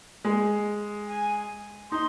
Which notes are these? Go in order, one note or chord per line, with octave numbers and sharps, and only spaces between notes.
G#3
G#5
D#4 C6